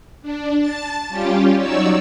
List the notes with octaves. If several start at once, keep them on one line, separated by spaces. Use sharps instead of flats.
D4
A5 A6
G3 C#4 F4 G4
F#3 D#4 C#5 D5 E6